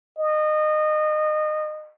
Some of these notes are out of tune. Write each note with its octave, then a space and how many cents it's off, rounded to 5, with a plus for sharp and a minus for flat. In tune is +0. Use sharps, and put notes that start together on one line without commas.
D#5 -25